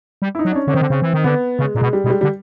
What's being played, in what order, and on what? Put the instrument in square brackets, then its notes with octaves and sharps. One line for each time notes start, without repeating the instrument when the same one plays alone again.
[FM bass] G3
[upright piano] E4
D#4
[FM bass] F#3
[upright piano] D4
C#4
[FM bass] D3 [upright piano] C#4
[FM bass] D#3 [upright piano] C4
[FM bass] D3
[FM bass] C#3 [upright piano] C4
[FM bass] E3
D#3
[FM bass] D3 [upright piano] B3
[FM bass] C#3 [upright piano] G#3
[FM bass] A#2 [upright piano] G#3
[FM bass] B2
[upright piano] G3
[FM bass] B2 [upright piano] G#3
[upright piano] G3
[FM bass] D3 [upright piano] G3